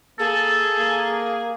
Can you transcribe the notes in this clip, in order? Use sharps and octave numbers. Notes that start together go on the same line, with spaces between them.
A#3 G#4 A4
A#3